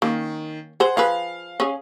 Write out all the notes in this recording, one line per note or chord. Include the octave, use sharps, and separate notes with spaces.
D#3 A#3 C#4
G#4 C5 F#5
F3 G#4 B4 F5
C#4 G#4